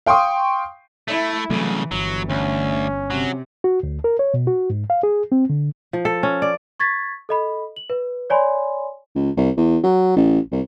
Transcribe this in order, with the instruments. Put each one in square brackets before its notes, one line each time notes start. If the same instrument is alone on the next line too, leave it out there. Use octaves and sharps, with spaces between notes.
[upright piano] F5 G5 C6 C#6 D#6
[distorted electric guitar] A3 [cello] E4
[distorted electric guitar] C2 C#3 [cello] E3 [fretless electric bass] F#3 A3
[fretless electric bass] G1 [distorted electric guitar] F#3
[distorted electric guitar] D2 [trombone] C#4
[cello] C3 [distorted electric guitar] F#3
[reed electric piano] F#4
D2
A#4
C#5
B2
F#4
G#2
F5
G#4
C4
D3
[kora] F3
A4
C#4
D5
[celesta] C#6 G#6 A6 B6
A4 D#5 B5
F#7
B4
C#5 D5 G#5 B5 C6
[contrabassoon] C#2
C2
E2
F#3
A1
C2